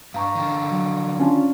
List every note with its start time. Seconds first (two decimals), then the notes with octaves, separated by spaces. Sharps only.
0.14 G2 F5 A#5 C#6
0.35 D3 D#3
0.71 F#3
1.19 C#4 D4 F4